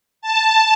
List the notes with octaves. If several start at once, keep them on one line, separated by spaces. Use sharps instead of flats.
A5